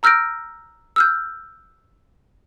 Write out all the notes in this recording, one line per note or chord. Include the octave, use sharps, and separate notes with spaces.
A#5 E6 F6 G6 A#6 D7
E6 F6 G6